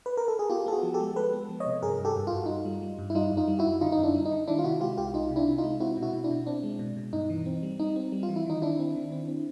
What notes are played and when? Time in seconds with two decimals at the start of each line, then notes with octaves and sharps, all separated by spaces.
0.06 B4
0.17 A#4
0.28 A4
0.39 G#4
0.50 B3 F4 G4
0.66 B3 A4
0.72 F#4 G#4
0.83 F3
0.94 G4 A4
1.00 G#3
1.16 G#3 A4 B4
1.33 B3
1.49 F3
1.60 C#5 D#5
1.66 C3
1.82 G2 G#4 A#4
1.99 G2
2.05 G4 A4
2.16 G2
2.27 F4
2.32 G2 F#4
2.46 G2 D#4 F4
2.65 G3
2.82 G3
2.99 G2
3.10 E4
3.15 G3 D#4 F4
3.31 F#2
3.37 D#4 F4
3.48 G3
3.59 E4 F#4
3.65 F#2
3.81 D3 D#4 F4
3.92 D#4
3.98 F#2
4.03 D4 E4
4.14 G3
4.25 D#4
4.31 D3
4.48 D#3 D4 E4
4.59 F4
4.64 C3 E4 F#4
4.81 G#3 F4 G4
4.97 C2 F4 G4
5.14 C2 D#4 F4
5.31 C3
5.36 D4 E4
5.47 C3
5.58 D#4 F4
5.64 G#3
5.80 C4 E4 F#4
5.97 B2
6.02 E4 F#4
6.13 B2
6.24 D4 E4
6.31 B2
6.47 C4 D4
6.63 G#3
6.79 B2
6.97 B2
7.12 G2 D#4
7.30 E3
7.46 C4
7.63 G3
7.79 G3 D#4
7.96 C4
8.12 G3
8.23 F4
8.29 E3
8.36 E4
8.46 D#3 D#4
8.62 D#3 D4 E4
8.79 C4
8.96 D#3
9.12 C4
9.28 C4